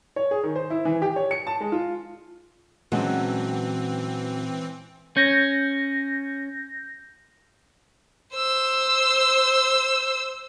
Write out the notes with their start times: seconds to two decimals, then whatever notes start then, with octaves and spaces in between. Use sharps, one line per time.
0.16 C#5
0.31 G#4
0.44 D#3
0.56 C5
0.70 E4
0.85 E3
1.02 G4
1.16 C#5
1.31 C#7
1.47 A5
1.60 G#3
1.72 F4
2.92 A#2 D3 E3 F#3 G#3 C4 C#4
5.17 C#4 G6 A#6
8.35 C5 E6